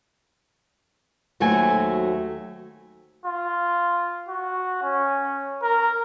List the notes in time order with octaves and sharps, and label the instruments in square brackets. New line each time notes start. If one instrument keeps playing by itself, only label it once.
[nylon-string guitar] D#2 F#3 A3 C4 F#4 G#5
[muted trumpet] F4
F#4
C#4
A#4